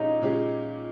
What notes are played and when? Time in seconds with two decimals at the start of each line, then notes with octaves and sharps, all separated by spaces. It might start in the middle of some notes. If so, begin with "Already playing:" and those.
Already playing: A#2 G#3 C#4 D#4 G4 C#5
0.21 A#2 G#3 C#4 G4 C#5